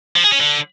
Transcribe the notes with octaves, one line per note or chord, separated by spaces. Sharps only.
F3
G#4
C#4
D3